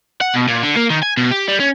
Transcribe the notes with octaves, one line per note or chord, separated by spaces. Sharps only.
F#5
B2
A#2
D3
A#3
D#3
G#5
B2
G4
G3
C#4